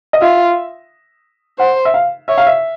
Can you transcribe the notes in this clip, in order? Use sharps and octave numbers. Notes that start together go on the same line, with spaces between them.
D#5
F4 E5
C5 F#5
E5
F5
C#5 E5
F5
E5